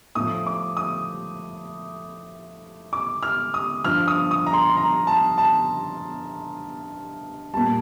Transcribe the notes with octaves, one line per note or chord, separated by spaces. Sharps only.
A2 F3 D#6
D6
D#6
D6
F6
D#6
G2 F3 F6
D#6
D#6
A#5
C6
A#5
A5
A5
A#2 G3 A5